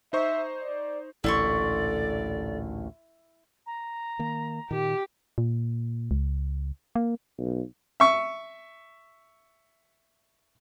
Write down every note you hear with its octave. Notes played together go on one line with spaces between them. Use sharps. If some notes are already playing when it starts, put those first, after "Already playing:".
D#4 C5 E5 C#6
D5
A1 D2 A#2 E4 A4 D5 C6 C#6
A#5
D#3 A#3
A#2 D#3 G4
A#2
C#2
A#3
B1
E5 C#6